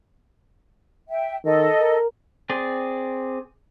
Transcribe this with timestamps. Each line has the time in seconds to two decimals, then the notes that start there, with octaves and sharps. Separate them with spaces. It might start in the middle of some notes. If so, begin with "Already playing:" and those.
1.09 E5 G5
1.45 D#3 A4 D#5
1.80 A#4
2.50 C4 G#4 D5